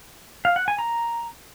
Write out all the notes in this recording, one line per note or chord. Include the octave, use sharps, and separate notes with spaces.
F5
F#5
G#5
A#5